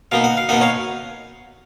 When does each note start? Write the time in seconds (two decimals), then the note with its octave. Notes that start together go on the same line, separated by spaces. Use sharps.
0.12 B2 A#3 D#4 F5
0.24 F#5
0.37 F5
0.49 B2 A#3 D#4 F#5
0.61 C#5 F5